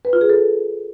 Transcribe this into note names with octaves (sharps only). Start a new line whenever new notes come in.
B4
F4
G#4
A4